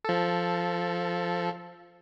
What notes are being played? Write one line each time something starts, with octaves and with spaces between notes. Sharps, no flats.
F3 A4